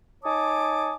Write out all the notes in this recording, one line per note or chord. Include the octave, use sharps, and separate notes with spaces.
D#4 C#5 G#5 A5 D6 D#6